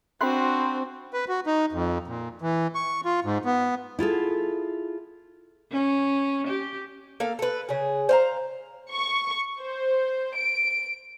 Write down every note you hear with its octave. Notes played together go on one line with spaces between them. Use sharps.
C4 D4 F#4 B5 C6 F#6
B4
F#4
D#4
F2
A#2
E3
C#6
F4
G#2
B3
E4 F4 G#4 A4
C#4
G4
A#3 A4 F5
A4 B4
C#3 G#4
C5 F5 A#5
C#6
C5
D7